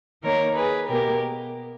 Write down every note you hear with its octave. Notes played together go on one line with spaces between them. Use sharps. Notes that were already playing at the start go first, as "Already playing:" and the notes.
D#3 A#3 A#4 C#5
G#4 B4
B2 A#3 G4 A#4